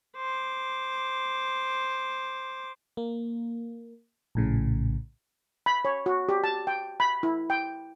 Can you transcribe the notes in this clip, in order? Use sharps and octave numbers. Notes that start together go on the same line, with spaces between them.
C5 D6
A#3
A#1 A2 C#3
B5
C#5
F#4
G4
A5
G5
B5
E4
G5